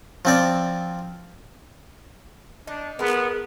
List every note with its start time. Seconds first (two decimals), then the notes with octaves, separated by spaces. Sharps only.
0.25 F3 C4 D5
2.67 D4 D#4
2.99 G#3 B3 A#4